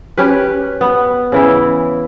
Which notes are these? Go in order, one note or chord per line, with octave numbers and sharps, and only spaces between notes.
C#4 G4 B4
B3
C#3 E3 E4